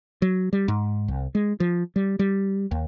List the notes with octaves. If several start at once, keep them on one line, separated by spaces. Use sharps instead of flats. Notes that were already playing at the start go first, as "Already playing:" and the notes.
F#3
G3
G#2
C2
G#3
F3
G3
G3
D#2